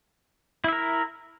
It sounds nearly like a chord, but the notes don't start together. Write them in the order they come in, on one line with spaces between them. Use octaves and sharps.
E4 E5 A#4